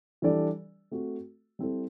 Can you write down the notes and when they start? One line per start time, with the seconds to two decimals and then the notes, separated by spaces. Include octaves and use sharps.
0.22 E3 G3 D4 A4 D5
0.91 A3 C4 F#4
1.59 G3 C4 E4 A4